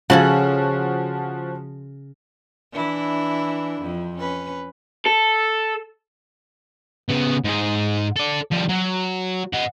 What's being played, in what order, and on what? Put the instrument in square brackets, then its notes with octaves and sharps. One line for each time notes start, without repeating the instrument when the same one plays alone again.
[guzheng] C#3 C#4 A4 [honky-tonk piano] F3 F#4 F#7
[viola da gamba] E3 D4 E4
F2 F3
C#4 B4
[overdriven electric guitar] A4
[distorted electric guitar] C#3 B3
G#2 G#4
A4 D5
F3 G3
F#3
D#5 F#5